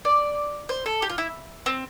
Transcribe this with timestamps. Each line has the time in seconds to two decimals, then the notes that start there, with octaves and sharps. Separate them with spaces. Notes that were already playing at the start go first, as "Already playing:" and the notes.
0.05 D5
0.69 C5
0.86 A4
1.02 G4
1.09 F4
1.18 E4
1.66 C4